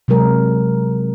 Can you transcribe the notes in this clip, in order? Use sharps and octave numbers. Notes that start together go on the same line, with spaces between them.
C3 F#3 G#3 A#4